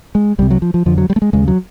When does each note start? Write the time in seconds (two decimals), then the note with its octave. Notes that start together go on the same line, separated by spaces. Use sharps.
0.15 G#3
0.38 C2 C3 G3
0.50 F#3
0.62 F3
0.74 F3
0.86 F2 D3 F3
0.98 F#3
1.10 G3
1.16 A3
1.22 G#3
1.33 D#2 C#3 G#3
1.48 F#3